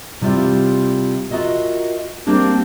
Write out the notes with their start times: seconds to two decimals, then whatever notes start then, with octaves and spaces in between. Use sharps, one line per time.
0.21 C3 G3 E4 F4
1.31 F4 F#4 A#4 D#5 E5
2.26 G3 A#3 C4 D4 G4